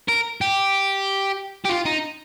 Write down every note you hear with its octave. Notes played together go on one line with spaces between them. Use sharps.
A#4
G4
G4
F4
D#4